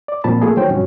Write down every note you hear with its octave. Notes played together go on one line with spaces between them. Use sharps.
D5
A#2 F3 C4 A5 B5
A3 A#3 F4 G#4 A4
D#3 F#3 C5 C#5 G5
G2 B2 F3 C#4 F#4